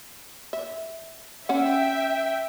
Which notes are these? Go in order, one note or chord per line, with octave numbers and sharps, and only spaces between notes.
E5
C#4 E5 F#5 G5